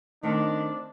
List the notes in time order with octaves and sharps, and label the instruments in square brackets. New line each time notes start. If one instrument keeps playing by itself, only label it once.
[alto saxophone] D#3 [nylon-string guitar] A3 C4 D#5 [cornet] D4